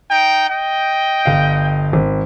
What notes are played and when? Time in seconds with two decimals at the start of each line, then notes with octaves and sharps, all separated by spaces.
0.10 D#4 G5
0.49 D#5 G5
1.26 G1 F5
1.93 G#1